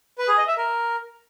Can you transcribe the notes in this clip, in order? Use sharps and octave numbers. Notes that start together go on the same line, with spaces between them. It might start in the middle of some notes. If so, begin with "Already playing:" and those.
B4
G#4
D#5
E5
A#4